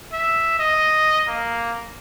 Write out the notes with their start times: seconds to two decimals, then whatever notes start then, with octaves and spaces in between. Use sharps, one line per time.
0.13 E5
0.59 D#5
1.28 A#3